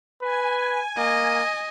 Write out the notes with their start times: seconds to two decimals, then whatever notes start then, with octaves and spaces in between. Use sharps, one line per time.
0.22 B4 G#5
0.97 A#3 D#5